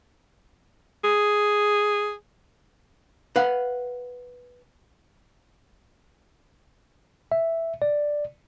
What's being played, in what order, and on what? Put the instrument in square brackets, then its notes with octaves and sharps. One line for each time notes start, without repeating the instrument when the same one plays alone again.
[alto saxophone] G#4
[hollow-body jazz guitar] B4 F5 F#5
[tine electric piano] E5
D5